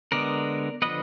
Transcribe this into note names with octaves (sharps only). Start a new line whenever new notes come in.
D3 G#3 B3 A#4 D5
D3 F3 B3 B4 D#5